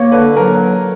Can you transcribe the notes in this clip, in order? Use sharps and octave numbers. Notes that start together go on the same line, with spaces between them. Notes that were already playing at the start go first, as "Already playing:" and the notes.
Already playing: A#3 C#5
D3 B4
F#3 A#4